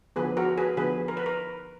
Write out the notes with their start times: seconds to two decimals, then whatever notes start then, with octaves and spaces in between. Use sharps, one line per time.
0.16 D3 F3 B3 G#4 B4
0.37 F#4 A#4
0.58 G#4 B4
0.77 D3 F3 B3 G#4 B4
1.08 A#4
1.17 B4
1.26 A#4